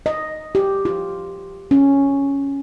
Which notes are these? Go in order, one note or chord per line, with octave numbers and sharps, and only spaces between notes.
D#5
G4
F4
C#4